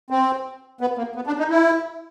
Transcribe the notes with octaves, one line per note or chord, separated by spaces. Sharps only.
C4
B3
A#3
B3
D4
D#4
E4